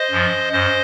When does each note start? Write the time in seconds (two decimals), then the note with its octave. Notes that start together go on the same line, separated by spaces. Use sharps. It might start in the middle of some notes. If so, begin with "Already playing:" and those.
Already playing: C5 D#5
0.11 F#2 F3
0.52 F#2 C5 D#5